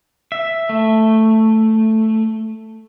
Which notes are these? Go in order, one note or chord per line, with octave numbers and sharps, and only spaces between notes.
E5
A3